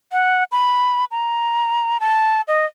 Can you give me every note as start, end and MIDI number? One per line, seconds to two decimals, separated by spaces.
0.12 0.44 78
0.52 1.05 83
1.11 1.98 82
2.00 2.41 81
2.48 2.66 75